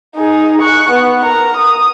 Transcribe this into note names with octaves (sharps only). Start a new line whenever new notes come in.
D#4 G#4
C#6 F#6
B3
A#4 A#5
D#6